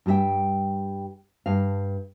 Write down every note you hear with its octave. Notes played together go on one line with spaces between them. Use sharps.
G2 G3 F#4 E5 G5
G2 F5